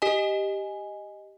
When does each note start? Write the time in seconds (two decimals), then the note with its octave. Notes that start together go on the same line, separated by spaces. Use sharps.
0.02 G4 D#5 G#5